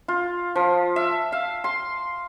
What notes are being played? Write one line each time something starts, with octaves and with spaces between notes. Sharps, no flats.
F4
F3
E5
F5
C6